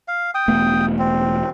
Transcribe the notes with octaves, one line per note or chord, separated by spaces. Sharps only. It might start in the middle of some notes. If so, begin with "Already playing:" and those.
F5
G5 D#6
E1 A3 B3
C4